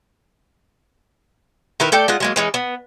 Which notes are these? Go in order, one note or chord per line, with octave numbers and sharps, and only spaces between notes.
D#3 E4 A#4 B4
A3 A4 D5 G5
G#3 F4 F#5
F#3 G#3 A#3
E3 G#3 C#4
B3